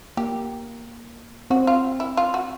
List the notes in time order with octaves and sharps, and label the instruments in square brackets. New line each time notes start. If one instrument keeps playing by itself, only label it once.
[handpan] A#3 [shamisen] G4
[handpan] C4 [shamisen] F#4
[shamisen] F4
E4
F4
F#4